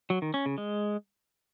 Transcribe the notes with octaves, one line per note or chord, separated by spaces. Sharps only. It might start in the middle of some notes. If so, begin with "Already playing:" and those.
F#3
D#3
C#4
C#3
G#3